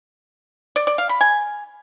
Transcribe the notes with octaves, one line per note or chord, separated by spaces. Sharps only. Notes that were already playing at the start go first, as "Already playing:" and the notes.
D5
D5
F5
B5
G#5